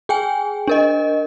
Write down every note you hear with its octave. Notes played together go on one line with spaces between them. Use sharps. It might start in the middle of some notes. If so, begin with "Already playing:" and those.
G#4 G5 G#5
D4 A#4 D#5